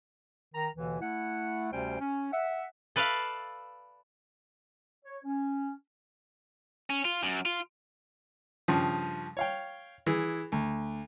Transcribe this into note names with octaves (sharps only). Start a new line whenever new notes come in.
D#3 A#5
D#2 B2 D3 E3
A3 E4 F#5
D2 C3 G3 C#4 C5 G5
C#4
E5 F#5
A4 B4 D5 E5 F5
C#5
C#4
C#4
F4
F#2
F4
G2 C#3 F3
C#5 F5 G5
E3 G#4
D2